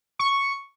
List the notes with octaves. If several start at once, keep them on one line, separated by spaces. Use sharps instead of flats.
C#6